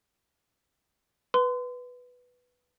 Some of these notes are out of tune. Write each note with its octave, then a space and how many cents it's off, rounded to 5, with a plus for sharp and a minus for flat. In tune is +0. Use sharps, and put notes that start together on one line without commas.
B4 +0 C6 -35